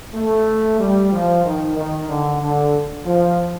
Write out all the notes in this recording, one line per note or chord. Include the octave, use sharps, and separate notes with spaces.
A3
G3
F3
D#3
D#3
D3
D3
F3